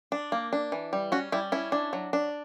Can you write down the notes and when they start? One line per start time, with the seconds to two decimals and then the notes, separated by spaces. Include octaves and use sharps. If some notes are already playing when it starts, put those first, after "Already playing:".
0.12 D4
0.32 A#3
0.53 D4
0.72 E3
0.93 G3
1.12 C#4 F#4
1.32 G3 E4
1.52 C#4 E4
1.72 D4
1.93 F#3
2.13 D4